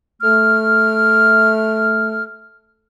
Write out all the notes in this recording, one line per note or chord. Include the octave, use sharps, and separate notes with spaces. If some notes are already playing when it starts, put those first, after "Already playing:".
A3 F6